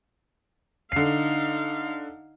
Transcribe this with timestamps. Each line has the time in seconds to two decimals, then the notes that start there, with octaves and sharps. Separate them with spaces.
0.92 D3 D#4 F5 C7